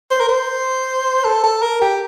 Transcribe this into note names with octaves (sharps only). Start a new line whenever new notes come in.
C5
A#4
C5
A4
A4
A#4
G4